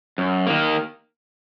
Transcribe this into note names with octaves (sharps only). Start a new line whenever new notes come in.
F#2
D#3 A#3